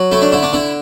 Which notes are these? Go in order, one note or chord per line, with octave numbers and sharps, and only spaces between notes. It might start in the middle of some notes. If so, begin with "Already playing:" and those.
Already playing: F#3
A3 E4
D4
D3 E4
D4
D3 E4